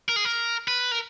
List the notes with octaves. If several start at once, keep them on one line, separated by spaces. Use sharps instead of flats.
A#4
G#4
A#4
B4
A#4